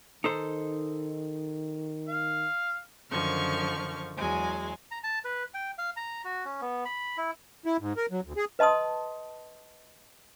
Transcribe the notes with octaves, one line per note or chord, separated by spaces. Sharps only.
D#3 D#4 A4 C5
F5
F#2 D3 D#3 F3 C#6 F6
E2 F#3 G#3 G#5
A#5
A5
B4
G5
F5
A#5
F#4
C#4
B3
B5
E4
E4
G#2
A#4
F#3
D2
G#4
B4 D#5 A5 C6 D#6